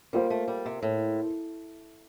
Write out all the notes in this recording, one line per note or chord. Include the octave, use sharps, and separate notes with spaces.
G3 A#3 F4 C5 F5
A3
G3
C3
A2